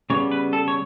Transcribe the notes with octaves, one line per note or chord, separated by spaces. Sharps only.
C#3 G3 B3 C#5
B4
A4
C#5